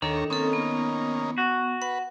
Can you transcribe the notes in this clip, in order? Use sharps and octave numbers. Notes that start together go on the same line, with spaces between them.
D#2 D#3 D4 A4 C#5 A#5
A#3 C4 C#4 D#4 A4
B3
F#4
B4 F#5